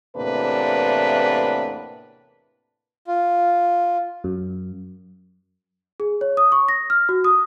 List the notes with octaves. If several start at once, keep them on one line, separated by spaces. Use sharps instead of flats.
E2 A2 C3 A#3 D4 B4
F4
F#2
G#4
C#5
D#6
C#6
A#6
F6
F#4
D#6